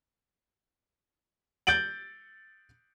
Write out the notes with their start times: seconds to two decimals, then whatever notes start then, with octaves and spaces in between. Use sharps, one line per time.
1.67 G6 A6 D7 F#7